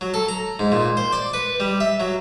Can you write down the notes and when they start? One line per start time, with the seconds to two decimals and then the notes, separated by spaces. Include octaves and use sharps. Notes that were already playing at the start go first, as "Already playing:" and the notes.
0.01 F#3
0.14 A4
0.28 A#5
0.59 G#2
0.72 A#2
0.97 C5
1.13 D5
1.33 B4
1.60 G3
1.80 E5
2.00 F#3